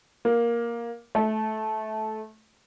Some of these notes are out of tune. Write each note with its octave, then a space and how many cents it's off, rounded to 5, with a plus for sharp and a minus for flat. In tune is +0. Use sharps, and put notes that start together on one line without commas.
A#3 +10
A3 -15